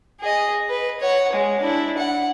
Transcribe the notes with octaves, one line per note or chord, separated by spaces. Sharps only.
G#4 D#5
B4
C#5 F#5
G#3
D4 E4
F#5